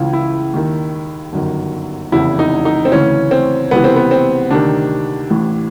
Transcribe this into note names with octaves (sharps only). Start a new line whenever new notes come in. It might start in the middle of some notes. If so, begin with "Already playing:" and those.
Already playing: C#2 C#3 E3 F4
E4
D#2 D#3
G1 F#2 D#3
F1 E2 C#3 E3 E4
D#4
D#4
C4
D2 C#3 E3 C#4
C4
C#2 C3 E3 B3
C4
B3
C4
D2 C3 D#3 D4
A1 A2 E3